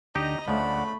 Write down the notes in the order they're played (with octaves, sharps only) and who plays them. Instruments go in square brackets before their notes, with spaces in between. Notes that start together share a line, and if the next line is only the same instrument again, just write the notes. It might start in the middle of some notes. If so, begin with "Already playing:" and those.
[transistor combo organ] D2 D3 [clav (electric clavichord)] D#4 G4 [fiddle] D#5 A#5
[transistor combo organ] D2 D5 F#5 [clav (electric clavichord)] C#3 F3 [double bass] A3 [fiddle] B5